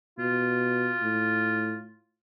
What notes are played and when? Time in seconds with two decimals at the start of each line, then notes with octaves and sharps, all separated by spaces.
0.18 B2 F4
1.02 A2